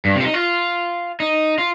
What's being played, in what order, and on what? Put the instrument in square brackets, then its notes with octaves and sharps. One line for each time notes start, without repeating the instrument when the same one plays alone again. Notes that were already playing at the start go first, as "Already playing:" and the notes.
[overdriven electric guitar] G2
C3
F4
D#4
F4
D#4
F4